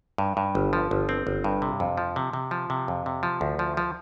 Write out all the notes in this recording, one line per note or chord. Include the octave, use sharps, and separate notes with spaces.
G2
G2
G1
F3
G1
C4
G1
G2
C3
F2
F3
C3
C3
F3
C3
F2
C3
F3
D2
F3
F3